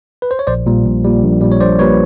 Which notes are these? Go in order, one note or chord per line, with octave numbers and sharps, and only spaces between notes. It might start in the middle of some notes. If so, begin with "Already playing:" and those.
B4
C5
C#5
A#1 C5 D5
A#2 G3
A#1
A#2 G3
A#1
A#2 G3
C#5
A#1 C5 D5
A#2 G3 B4 C#5